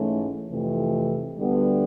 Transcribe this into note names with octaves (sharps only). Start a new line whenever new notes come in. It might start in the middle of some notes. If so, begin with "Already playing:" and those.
Already playing: G#2 E3 A3 C#4
F2 C3 E3 A3
D2 D3 G3 B3